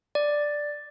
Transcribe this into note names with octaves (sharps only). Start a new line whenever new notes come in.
D5